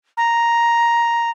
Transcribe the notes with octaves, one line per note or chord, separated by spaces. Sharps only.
A#5